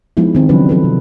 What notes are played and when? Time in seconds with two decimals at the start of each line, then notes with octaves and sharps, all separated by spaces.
0.17 F3 G#3 B3 D#4 E4
0.35 D#3 C4
0.49 C#3 F3 F#3 C#4 D4 B4
0.69 F3 A4 B4
0.84 C3